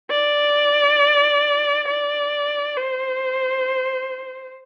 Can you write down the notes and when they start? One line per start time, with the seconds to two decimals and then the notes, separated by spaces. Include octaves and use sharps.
0.10 D5
1.88 D5
2.77 C5